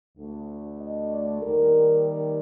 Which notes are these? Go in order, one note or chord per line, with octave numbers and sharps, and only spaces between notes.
D2 D3 A3
D#5
D5
D#2 D#3 G3 A#4
A#4